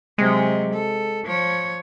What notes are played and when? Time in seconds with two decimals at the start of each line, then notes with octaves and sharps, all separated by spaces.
0.18 C3 F#3 G#3
0.74 A4
1.25 F3 C#5